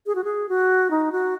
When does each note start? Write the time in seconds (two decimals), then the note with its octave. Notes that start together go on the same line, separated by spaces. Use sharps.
0.06 G#4
0.15 F#4
0.24 G#4
0.49 F#4
0.91 D#4
1.12 F#4